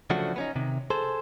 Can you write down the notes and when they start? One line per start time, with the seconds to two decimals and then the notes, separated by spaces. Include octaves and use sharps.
0.10 C#3 F3 F#3 A3 D4 F#4
0.36 B3 C#4 D#4
0.56 C3 D#3
0.90 G#4 A4 C5